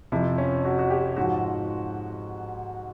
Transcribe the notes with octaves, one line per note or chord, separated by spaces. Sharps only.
F2 C3 F3 E4
C#4
F#4
F#4
G4
G#2 F3 F#4